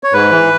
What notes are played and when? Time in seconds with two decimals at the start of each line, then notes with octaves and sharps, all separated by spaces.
0.03 C#5
0.13 G#2 B4
0.31 E3